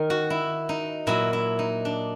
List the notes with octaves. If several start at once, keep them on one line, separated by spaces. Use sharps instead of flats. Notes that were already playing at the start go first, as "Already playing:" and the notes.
Already playing: D#3 A#4
F#4
E4
D#4
A#2 F#3 E4
E4
D#4
D4